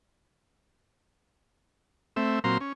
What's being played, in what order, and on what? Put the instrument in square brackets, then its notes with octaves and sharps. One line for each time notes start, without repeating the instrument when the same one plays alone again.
[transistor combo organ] A3 C4 E5
A#2 F#3 C4 F5 A#5 C6
C#4